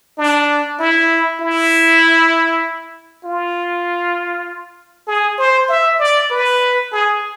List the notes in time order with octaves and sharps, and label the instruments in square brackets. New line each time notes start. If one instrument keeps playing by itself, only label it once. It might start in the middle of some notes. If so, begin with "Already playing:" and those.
[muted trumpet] D4
E4
E4
F4
G#4
C5
E5
D5
B4
G#4